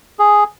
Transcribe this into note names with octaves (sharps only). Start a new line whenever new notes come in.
G#4